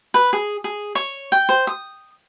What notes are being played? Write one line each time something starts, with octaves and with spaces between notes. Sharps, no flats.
B4
G#4
G#4
C#5
G5
C5
D#6